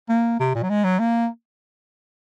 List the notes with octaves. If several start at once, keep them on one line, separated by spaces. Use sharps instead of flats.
A#3
C3
A#2
F#3
G#3
F#3
A#3